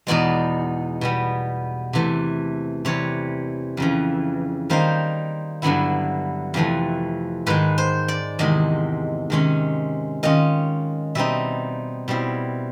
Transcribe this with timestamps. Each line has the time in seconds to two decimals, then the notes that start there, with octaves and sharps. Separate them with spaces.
0.07 E2 B2 G#3 B3 D#4 D5
1.01 B2 G3 B3
1.93 C3 E3 A3
2.85 C3 E3 G3 C#5
3.77 F2 C#3 E3
4.70 D#3 G3 A#3 D#4 C5
5.62 G2 D3 F#3 B3 E4
6.54 F2 C3 E3 A3
7.47 G#2 D#3 G#3 B4
7.78 C5
8.08 D5
8.39 E2 C3 D#3 G#3 D#5
9.30 C3 D#3 G#3 C#4
10.23 D#3 G#3 C#4 F4 D#5
11.15 B2 G3 C4 D#4 E5
12.08 B2 G3 C4 E4